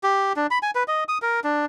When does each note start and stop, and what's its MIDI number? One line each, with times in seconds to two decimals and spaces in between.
0.03 0.33 67
0.36 0.47 62
0.51 0.58 83
0.63 0.71 80
0.75 0.83 71
0.88 1.04 75
1.08 1.18 87
1.22 1.40 70
1.44 1.66 62